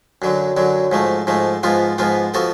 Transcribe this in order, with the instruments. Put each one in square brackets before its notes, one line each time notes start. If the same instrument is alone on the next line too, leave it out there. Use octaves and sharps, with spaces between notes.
[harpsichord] F#2 D3 F#3
F#2 D3 F#3
G#2 F3 A3
G#2 F3 A3
G#2 F3 B3 F4
G#2 F3 B3 F4
F3 B3 F#4 A4